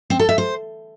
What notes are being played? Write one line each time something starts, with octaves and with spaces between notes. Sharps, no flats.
C4
A4
E5
C5